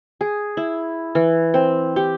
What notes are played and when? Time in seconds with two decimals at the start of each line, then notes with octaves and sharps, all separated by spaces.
0.21 G#4
0.57 E4
1.15 E3
1.54 C4
1.96 G4